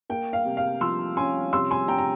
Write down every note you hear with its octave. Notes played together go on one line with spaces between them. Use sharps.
A#3 G5
F5
C3
F5
F3 C6 E6
C#4 G#5 C6
C3 C6 E6
G#5 C6
C3 G5 A#5
A#5